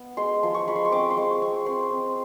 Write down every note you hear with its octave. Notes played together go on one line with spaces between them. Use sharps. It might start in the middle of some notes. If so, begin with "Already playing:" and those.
Already playing: B3
G#3 C6
F3 C6
C#6
G#3 B5
C6
C#6
C4 D6
C6
G#3 C#6
C4 C#6
C4 C6
C4